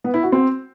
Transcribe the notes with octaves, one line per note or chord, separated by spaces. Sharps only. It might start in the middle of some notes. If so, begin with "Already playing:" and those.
B3
E4
F#4
C4